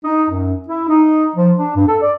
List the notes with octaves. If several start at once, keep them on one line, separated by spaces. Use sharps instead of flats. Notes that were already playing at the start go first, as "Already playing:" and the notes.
D#4
F#2
E4
D#4
F3
D4
G2
A4
D5